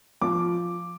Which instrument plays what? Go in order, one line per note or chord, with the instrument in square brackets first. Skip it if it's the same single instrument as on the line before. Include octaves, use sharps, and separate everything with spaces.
[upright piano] F3 D6